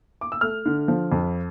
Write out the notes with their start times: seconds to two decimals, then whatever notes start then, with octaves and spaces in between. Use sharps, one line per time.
0.21 D6
0.32 E6
0.41 A3 F6
0.66 D3
0.88 F3
1.12 F2